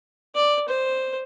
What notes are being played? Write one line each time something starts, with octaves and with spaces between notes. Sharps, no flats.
D5
C5